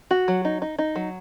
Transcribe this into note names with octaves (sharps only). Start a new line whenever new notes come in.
F#4
F#3
D#4
D#4
D#4
F#3